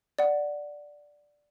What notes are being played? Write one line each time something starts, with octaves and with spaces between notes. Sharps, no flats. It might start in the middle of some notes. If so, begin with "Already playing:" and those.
D5 F#5